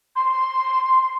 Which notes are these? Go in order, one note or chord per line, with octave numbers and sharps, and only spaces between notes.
C6